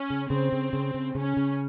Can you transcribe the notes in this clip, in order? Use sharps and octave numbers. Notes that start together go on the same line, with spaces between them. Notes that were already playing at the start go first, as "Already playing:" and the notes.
Already playing: C#4
C#3
C#3 C4
C#3
C#3
C#3
C#3 C#4
C#3